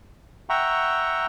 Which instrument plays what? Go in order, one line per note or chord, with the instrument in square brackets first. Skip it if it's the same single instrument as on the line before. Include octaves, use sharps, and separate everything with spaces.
[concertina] E5 F#5 G5 A#5 C#6